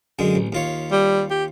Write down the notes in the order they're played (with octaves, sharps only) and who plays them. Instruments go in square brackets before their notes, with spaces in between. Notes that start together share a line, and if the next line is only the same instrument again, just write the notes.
[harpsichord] F#2 D3 G#3
A1
D#2 F4 C#5
[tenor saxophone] G3
G4